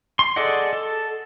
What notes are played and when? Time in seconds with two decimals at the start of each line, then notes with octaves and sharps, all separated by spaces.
0.19 C6
0.36 G#4 A4 D5 D#5 F#5
0.73 A4